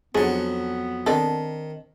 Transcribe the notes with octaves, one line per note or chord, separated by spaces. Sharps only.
F2 F#3 B3 D4 G#4
D#3 C4 D4 A4